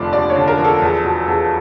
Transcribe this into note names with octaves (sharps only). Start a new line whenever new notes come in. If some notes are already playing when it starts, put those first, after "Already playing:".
Already playing: F1 D3 F3 D5
D#2 D5
C#5
D3
A#4
F3
A4
E2
B2
E2